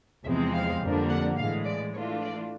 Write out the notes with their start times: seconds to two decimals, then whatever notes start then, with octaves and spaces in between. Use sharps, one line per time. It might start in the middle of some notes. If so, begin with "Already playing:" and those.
0.24 E2 C3 F3 G#3 C4 E5
0.53 F5
0.81 F2 D3 G3 A#3 D4
1.09 F#5
1.37 A2 E3 G#3 F5
1.65 D5
1.93 E3 A3 D4 F4 C#5
2.22 D5